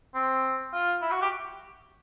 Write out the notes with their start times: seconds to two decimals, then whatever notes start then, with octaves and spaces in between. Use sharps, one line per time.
0.15 C4
0.73 F4
1.02 E4
1.11 F#4
1.22 G4